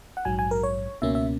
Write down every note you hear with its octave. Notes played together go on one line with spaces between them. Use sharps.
F#5
A#1 G#2 F#3 G#5
G#5
A#4
C#5
C#2 B2 A#3 C#4 E5
E5